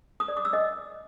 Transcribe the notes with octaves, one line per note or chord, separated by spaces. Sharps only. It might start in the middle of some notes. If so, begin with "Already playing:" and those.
D#6
D5
D6
E6
D#5